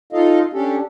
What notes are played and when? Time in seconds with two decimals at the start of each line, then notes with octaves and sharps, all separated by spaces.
0.13 D#4 F4 A4 D#5 F5
0.53 C#4 D4 G4 A4